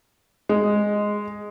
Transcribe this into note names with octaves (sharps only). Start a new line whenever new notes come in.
G#3